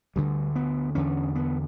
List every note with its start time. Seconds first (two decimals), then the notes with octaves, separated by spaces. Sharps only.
0.16 D2 D3 G3
0.56 B3
0.95 E2 D3 C#4
1.35 B3